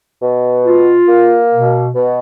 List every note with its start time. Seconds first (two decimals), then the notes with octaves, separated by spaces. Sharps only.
0.21 B2
0.64 F4
1.08 A#3
1.52 B2
1.95 B2